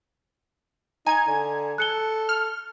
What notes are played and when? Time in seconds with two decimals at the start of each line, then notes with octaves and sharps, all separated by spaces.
1.06 D#4 G#5 A#5 G#6
1.27 D3
1.78 A4 F#6 C#7 G7
2.29 F6